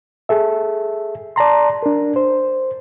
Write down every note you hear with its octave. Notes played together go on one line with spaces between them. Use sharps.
G#4 A4 E5
D5 A5 A#5 C6
D4 A#4
C5